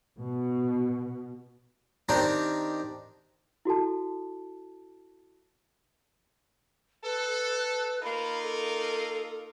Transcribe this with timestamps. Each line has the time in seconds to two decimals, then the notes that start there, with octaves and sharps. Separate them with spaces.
0.19 B2
2.09 D#3 C4 D4 G4 A#4
3.65 E4 F#4 A4 A5
7.04 A4 B4
8.03 A#3 D#4 F4 B5
8.42 A4